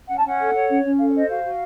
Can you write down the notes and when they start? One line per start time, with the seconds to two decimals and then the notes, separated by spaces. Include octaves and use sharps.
0.08 C#4 F#5
0.18 A5
0.23 C#4
0.28 F#5
0.38 A4
0.53 C#5
0.69 C#4
0.83 C#4
0.98 A4 F5
1.09 C#5
1.13 C5
1.18 D#5
1.29 F#4 F5
1.44 F#4